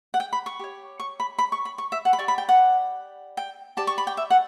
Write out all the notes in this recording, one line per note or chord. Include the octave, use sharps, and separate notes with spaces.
F#5
G5
B5
C#6
G4 C#5
C#6
B5
B5
C#6
B5
C#6
E5
F#5
B5
G4 D5 C#6
B5
G5
F#5
G5
G4 D5 A5
C#6
B5
G5
E5
F#5